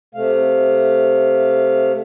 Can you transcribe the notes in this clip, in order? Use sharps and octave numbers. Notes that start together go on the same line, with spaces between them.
C3 A3 F5